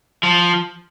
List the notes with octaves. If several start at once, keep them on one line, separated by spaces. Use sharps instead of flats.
F3